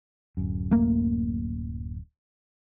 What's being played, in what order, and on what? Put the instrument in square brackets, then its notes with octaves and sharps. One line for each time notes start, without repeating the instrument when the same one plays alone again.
[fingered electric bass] D1 F#2
[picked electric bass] A3 A#3